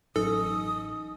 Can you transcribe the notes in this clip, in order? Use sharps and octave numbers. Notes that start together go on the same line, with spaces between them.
A1 F#3 C#4 D#4 A4 D#6